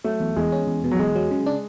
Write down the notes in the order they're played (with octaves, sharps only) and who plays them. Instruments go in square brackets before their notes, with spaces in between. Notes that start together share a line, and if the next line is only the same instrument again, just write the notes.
[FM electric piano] F#3 [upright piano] A3
[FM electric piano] E2
[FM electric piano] E2 [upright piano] G#3
[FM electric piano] C#4
E2
B2
[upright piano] F#3
[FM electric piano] E2 [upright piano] G#3
[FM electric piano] F#3
C#3
D4